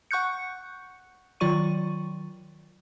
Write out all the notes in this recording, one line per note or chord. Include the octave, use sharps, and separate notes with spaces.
F#5 C#6 F#6 G6 C#7
D#3 F#3 F4 D5 C#6 D#7